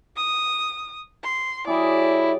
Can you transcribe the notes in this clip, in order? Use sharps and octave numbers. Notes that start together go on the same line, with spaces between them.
D#6
C6
F#3 E4 G4 G#4 D5